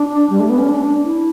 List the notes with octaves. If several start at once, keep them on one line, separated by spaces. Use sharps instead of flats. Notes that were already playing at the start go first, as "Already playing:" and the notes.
Already playing: D4
G3
A3
B3
C#4
D4
E4